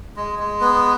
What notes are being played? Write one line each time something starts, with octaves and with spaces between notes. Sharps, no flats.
G#3
G#3
B3